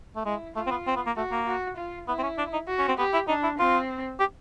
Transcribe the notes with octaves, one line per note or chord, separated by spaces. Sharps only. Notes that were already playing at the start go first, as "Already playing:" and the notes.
A3
G#3 E4
A3 F4
C4
B3
C4
B3
A#3
A3 F#4
A#3
F#4
F4
B3 E4
C4
C#4
D4
D#4
F#4
C#4
C4
B3 G4
E4
D4 D#4
E4
C4 F4
G4